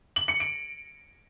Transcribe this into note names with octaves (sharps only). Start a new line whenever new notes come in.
F#7
C#7
D7